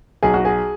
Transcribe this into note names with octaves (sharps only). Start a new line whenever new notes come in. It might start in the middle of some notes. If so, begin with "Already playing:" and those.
B1 G#4
F#4
G#4